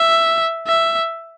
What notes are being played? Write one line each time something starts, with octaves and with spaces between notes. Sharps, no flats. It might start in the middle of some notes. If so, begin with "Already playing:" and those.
Already playing: E5
E5